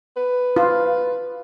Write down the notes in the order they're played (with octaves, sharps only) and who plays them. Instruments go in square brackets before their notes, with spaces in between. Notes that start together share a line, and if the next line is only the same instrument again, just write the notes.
[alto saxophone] B4
[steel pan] F4